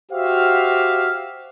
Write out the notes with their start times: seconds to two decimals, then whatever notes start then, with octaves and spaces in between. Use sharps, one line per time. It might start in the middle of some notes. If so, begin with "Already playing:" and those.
0.12 F#4 G4 C5 E5 F5